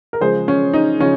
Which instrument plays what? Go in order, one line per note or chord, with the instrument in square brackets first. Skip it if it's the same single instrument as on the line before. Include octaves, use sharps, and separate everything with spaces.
[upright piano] A#4
C#3 F3 G#3 G#4 C5
C#4
D#4
C#3 F3 C#4